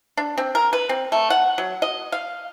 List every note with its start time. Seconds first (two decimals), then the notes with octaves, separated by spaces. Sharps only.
0.17 D4
0.38 C4
0.55 A#4
0.73 B4
0.89 C4
1.12 A3
1.30 F#5
1.58 F#3
1.82 D#5
2.12 F5